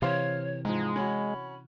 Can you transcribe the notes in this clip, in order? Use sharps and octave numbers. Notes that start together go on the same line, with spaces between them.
C3 E3 C5 C#5 F5 C6
G#2 F3 G#3
C#4 F#4 B5